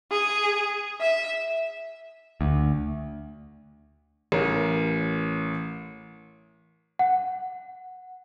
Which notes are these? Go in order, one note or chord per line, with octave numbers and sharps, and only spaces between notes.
G#4
E5
D2
A1 A#4
F#5